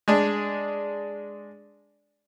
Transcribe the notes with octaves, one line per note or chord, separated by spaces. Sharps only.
G#3 D4